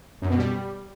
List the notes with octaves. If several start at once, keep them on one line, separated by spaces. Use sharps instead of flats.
F#2
B2
G3